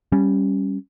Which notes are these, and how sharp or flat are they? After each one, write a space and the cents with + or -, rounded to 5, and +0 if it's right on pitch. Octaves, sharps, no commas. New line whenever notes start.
G3 +0 C#4 +0